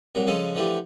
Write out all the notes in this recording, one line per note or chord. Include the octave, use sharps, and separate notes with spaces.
C2 A#2 F#3 A#5
C#3 F3 G#3 C#4 A4 D#5
D3 E3 F3 A3 G4